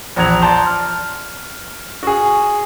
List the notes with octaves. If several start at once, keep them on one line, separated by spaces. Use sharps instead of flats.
A#1 E2 A#5 F#6 G#6 F7
D5 A5 A#5 C6 G6
F6
F#4 G#4